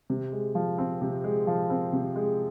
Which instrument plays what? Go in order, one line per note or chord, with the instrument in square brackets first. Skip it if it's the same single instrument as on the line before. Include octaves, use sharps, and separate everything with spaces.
[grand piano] C3
G#3
F3
C4
C3
G#3
F3
C4
C3
G#3